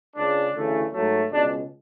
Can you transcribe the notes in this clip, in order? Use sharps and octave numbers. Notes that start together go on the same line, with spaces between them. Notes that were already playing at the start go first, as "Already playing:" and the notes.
C#2 C#3 G#3 D4
D2 C#3 E3 A3
G#2 F#3 A3
C#2 B2 G#3 D4